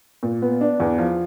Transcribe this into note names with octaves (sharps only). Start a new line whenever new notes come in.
A#2
B3
D4
E2
F3